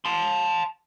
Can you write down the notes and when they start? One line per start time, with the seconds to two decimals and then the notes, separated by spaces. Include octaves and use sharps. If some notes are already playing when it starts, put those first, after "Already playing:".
0.05 A5 C6